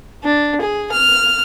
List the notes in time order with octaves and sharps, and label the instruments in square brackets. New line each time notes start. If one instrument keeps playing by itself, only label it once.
[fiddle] D4
G#4
F6